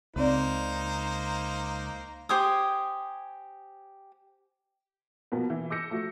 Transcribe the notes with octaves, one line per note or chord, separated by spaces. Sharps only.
C#2 C#3 A#3 C4 D#4 C5 D5
G4 C5 G#5 D#6
B2 F3 A#3 B3
E3
D6 E6 G6 A#6 C#7
F3 A3 F#4